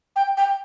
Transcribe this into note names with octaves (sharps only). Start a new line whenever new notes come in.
G5
G5